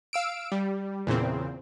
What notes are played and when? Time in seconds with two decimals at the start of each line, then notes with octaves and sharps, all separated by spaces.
0.13 F5 E6 D7
0.52 G3
1.07 E2 A#2 C#3 C4